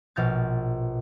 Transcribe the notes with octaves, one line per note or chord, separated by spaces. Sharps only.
A#1 B2 F6 G6 A6